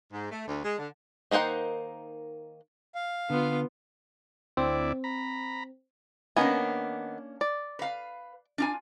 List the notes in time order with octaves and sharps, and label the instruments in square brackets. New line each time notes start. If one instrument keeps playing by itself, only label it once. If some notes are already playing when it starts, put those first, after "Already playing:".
[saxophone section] G#2
A3
D2
G#3
D3
[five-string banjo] D#3 A#3 D#4 C5 F#5
[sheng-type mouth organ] F5
[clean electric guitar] D3 [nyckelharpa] B3 F4
[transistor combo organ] D2 E4 D5 [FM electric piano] C4
[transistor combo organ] A#5 B5
[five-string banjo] D#3 B3 G#5 [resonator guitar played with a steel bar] A#3 C#4 D4
[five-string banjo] D5
[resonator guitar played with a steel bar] B4 F5
D4 F4 G#5